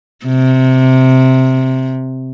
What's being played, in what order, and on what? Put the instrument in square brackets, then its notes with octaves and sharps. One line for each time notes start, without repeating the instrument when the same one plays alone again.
[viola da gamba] C3